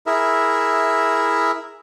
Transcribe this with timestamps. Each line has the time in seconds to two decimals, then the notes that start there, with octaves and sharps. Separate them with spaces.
0.07 E4 G#4 A#4 E5